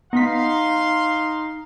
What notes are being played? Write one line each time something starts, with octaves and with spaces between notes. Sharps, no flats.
B3 D#4 F5 C6 B6